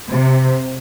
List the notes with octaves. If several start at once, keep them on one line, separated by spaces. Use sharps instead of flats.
C3